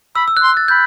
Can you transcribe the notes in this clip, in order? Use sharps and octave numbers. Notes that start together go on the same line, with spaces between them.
B5 E6
E6
F#6
C6
A6
B5 G6